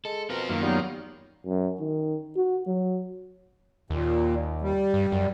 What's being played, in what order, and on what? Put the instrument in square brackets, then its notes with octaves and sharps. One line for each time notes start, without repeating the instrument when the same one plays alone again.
[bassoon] G#3 [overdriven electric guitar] A4
[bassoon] B2 [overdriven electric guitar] C4 F4 [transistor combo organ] A#4
[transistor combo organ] F#2 A#3 F4 [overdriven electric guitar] D#3
[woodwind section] F#3 B3 D#4 [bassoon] G3
[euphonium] F#2
D#3
F#4
F#3
[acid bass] D#2 [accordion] A#2
[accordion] G3
[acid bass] G2
F#2